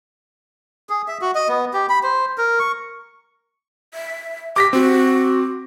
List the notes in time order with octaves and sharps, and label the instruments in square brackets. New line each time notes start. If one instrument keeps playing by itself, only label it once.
[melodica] G#4
E5
F#4
D#5
B3
G4
B5
C5
A#4
C#6
[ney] E5
[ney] G4 [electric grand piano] D6 A#6 B6
[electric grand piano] C4 [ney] F#4